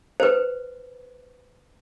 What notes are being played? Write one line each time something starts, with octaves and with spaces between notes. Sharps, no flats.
B4 C5